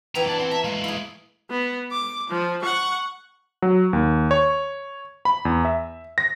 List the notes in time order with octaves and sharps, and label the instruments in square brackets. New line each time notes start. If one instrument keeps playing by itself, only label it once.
[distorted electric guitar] F2 A#5 [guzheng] E3 B3 G#5 [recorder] G5
[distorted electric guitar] D4 D5 [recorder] A5
[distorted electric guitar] C4 [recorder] F#5
[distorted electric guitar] E5 [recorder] A5 [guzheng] A#5
[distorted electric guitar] G#3 A3 [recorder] F5
[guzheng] E4 G#4
[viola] B3
D6
F3
F#5 C#6
[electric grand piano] F#3
D#2
C#5
B5
E2
E5
A#6